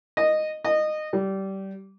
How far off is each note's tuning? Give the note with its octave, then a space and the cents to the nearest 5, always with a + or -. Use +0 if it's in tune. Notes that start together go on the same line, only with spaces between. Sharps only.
D#5 -10
D#5 -20
G3 -20